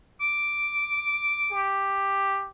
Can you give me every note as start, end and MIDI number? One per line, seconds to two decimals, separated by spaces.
0.21 1.68 86
1.51 2.48 67